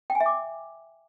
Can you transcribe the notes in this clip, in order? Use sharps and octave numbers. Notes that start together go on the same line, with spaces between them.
G5
G#5
E5
D6